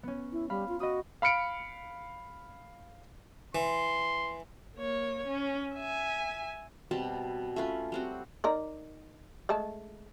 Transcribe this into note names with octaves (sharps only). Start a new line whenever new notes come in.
B3 C#4
E4
G3 F5 B5
F4
F#4 D#5 B5 D#6
F5 B5 F6 C#7 D7
E3 C6
A#3 C#5
C#4
E5 G#5
B2 G3 C4 A5
A3 C#4 F4 B4
G3 C4 F#4
D#4 A#4 D5
G#3 A3 A5